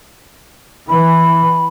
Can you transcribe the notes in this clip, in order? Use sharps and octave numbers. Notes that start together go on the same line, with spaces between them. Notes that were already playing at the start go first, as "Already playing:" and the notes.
E3 B5